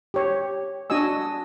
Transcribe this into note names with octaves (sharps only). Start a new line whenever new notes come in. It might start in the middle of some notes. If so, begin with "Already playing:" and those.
G4 C#5
D4 F#4 D#5 G#5 E6